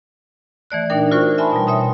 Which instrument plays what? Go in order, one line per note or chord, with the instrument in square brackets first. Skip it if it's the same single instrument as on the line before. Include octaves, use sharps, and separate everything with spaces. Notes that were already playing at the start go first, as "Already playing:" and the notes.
[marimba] E3 A3 D5 F#6
A#2 D4 D#4 A#4 G5
F4 F#4 A#4 C5 C#6
E5 G#5 A5 B5 C6
B2 G3
C#5 E5 C6 D#6